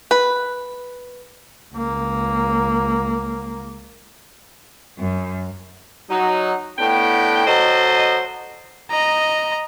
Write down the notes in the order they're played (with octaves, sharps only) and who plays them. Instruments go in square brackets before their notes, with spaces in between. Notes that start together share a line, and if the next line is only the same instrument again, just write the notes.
[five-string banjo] B4
[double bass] C#2 A#3
[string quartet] F#2
[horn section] F#3 D#4
A2 B3 D4 G5
F#3 A4 C5 D#5
[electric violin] D#5 A#5